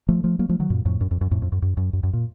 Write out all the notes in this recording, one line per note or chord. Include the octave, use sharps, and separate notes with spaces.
F3 A3
F3 A3
F#3 A#3
F3 A3
D#3 F#3
F#2 A#2
F2 A2
F#2
F2
F#2
F2 A2
F2
F#2
F#2
F#2
F#2
F#2
A#2